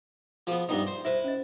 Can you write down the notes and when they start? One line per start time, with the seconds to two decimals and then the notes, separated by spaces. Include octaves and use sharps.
0.47 F3 B3 F4 G#4
0.69 G2 B3 D#4 F4 E5
0.87 C5
1.05 E4 B4 C5 E5
1.24 C#4 D#5